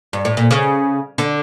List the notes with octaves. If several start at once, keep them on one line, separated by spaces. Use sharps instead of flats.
G2
A2
A#2
C#3
D3